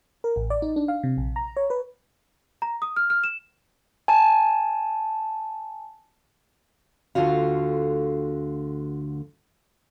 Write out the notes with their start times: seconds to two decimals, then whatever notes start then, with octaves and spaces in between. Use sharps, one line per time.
0.24 A#4
0.36 A1
0.50 D5
0.62 D#4
0.76 D4
0.88 F5
1.03 C3
1.17 A#1
1.36 A#5
1.57 C#5
1.70 B4
2.62 A#5
2.82 D#6
2.96 F6
3.10 F6
3.24 E7
4.08 G#5 A5
7.15 D2 D3 F4 F#4 F5